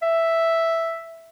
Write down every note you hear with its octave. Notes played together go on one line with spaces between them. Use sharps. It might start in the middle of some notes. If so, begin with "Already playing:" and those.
E5